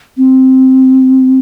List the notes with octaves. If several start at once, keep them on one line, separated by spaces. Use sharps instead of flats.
C4